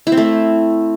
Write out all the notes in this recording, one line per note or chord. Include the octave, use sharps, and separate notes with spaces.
E4
C4
A3